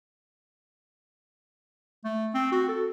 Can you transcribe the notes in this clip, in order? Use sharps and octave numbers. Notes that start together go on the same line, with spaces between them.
A3
C4
F#4
A4